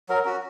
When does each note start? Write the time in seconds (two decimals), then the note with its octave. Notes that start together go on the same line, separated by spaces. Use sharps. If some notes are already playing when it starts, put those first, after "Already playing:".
0.09 F#3 A#4
0.25 C#4 F#4